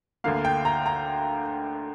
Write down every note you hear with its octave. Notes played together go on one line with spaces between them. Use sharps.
D2 D3 A#3 F5
G5
A#5
A#5